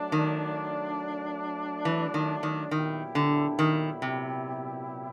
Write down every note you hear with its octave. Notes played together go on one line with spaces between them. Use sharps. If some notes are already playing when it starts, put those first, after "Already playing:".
Already playing: F#3 A3 D4
D#3
E3
D#3
D#3
A#2 D#3 F#3 B3 E4 G4
D3
D#3
C3